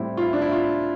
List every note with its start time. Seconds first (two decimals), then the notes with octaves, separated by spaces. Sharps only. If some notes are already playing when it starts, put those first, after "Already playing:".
Already playing: A2 G3 C4 E4
0.17 F4
0.22 E4
0.33 D4
0.42 E4
0.52 F4